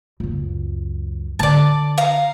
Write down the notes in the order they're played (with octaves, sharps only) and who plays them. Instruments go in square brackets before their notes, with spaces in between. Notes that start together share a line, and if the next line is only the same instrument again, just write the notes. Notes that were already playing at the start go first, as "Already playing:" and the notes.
[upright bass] C#2 F#2
[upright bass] D3 D4 [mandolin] D5 A5
[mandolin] F5 A#5